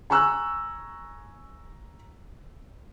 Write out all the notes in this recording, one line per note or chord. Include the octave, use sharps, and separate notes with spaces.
G#5 A#5 C#6 E6 F#6